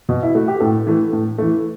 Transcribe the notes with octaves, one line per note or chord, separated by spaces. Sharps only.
B2
E4
A3 F#4
G4
A2 A4
E3 A3
A2
E3 A3